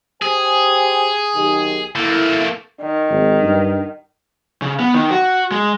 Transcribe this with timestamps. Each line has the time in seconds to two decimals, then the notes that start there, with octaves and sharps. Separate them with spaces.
0.22 G4 G#4 C5 G#5
1.35 B1 D#3 G4
1.96 A3 A#3 E4
2.82 D#3
3.11 G#1
3.43 G2
4.62 C#3
4.80 B3
4.94 D#3
5.11 F#4
5.51 G#3